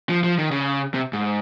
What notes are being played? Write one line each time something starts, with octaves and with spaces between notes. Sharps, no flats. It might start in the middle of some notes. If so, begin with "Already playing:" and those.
F3
F3
D#3
C#3
C3
G#2